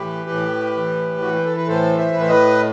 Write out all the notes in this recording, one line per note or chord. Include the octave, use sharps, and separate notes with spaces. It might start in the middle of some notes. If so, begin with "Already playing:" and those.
Already playing: A2 E3 G4 B4
A2
E3
E3 F#4
G4
A4
B4
A2 A4 C5
C5 E5
A2 B4
C5
B4 D#5